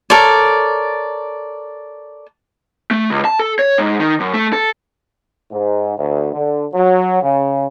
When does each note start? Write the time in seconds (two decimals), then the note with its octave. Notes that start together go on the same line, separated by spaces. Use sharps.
0.10 A4 A#4 C#5 D5
2.91 A3
3.10 C#2
3.25 A5
3.39 A4
3.59 C#5
3.78 G#2
4.00 D#3
4.20 F#2
4.34 A3
4.53 A4
5.51 G#2
5.98 D2
6.34 D3
6.73 F#3
7.22 C#3